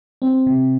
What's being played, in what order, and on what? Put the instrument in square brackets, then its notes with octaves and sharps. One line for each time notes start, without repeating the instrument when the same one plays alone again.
[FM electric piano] C4
C3